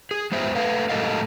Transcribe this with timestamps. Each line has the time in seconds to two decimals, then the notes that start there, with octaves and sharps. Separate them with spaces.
0.11 G#4
0.32 G#3 B3 C5 E5
0.55 A3 B4 F5
0.89 A2 G#3 A4 A#4 D#5 F5